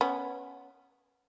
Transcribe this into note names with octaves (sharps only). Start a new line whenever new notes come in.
B3 C#4